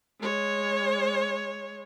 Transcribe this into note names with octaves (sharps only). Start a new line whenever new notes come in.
G#3 C#5